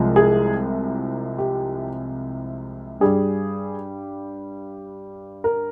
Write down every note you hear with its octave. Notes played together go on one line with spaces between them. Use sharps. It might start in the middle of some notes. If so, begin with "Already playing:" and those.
Already playing: C2 C3 F3 G#3
G#4
G4
G2 G3 G#4
A#4